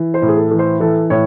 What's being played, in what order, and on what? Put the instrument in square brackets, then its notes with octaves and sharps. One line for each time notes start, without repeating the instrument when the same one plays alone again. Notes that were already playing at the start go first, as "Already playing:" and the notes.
Already playing: [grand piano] E3
C5
A2
G#4
A4
E3
C5
E3 A4
A2 C#5